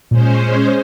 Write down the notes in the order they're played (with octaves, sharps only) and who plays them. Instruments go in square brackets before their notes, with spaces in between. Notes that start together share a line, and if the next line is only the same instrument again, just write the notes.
[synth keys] A#2 [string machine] G#3 C#4 C5